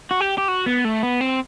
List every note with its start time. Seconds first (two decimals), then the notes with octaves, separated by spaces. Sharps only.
0.11 F#4
0.21 G4
0.38 G4
0.48 F#4
0.66 B3
0.85 A3
1.03 B3
1.21 C4